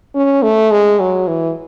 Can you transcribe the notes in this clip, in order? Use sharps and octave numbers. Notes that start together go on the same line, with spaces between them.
C#4
A3
G#3
F#3
E3